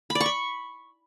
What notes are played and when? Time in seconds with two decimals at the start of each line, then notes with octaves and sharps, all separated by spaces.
0.10 B5
0.15 D5
0.21 C#6
0.26 B5